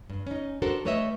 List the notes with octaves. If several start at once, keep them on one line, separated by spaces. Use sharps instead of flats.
G2
C#4 D#4
D4 F#4 A4 A#4 C5
G3 A3 B4 C#5 D#5 E5